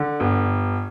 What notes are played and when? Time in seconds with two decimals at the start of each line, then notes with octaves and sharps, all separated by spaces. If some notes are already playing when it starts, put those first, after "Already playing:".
Already playing: D3
0.20 G1